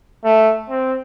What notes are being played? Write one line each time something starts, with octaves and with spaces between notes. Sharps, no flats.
A3
C4